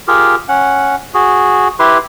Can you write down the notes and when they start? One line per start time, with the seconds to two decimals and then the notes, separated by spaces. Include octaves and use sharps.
0.08 F4 G4 G#4 A#4
0.49 C#4 F#5
1.14 F#4 G#4
1.79 E4 G4 B4 C6